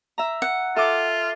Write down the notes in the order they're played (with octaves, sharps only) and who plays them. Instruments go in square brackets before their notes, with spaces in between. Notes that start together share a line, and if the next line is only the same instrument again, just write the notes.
[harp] E5 A#5
[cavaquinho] F#5
[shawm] F4 [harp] A4 D6 [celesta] E5